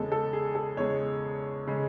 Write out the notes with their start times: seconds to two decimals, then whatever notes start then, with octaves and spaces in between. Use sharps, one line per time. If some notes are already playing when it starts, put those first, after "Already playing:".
Already playing: E2 C#3 G#3 A4
0.12 A4
0.33 G#4
0.55 A4
0.77 E2 C#3 G#3 C#5
1.67 C#3 G#3